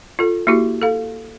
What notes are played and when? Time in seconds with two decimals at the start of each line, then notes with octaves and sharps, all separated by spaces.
0.19 F4 A4
0.47 A#3 E4 F#4 G4
0.82 A4 F5